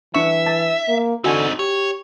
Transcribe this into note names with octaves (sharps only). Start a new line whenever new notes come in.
E3 D4 E5 C#6
A5
A#3
D3 C4 D#4 F#4 G#5
G4 C#5